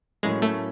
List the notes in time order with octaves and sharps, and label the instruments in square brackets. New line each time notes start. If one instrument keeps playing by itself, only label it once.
[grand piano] A2 F#3 A#3 C#4 [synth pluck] G#3
[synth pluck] A3